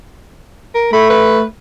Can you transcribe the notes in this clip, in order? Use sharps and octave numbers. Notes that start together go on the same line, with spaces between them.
A#4
A3 B5
B4